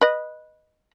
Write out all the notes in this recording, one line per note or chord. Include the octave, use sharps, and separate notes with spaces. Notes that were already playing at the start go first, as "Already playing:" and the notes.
B4 D#5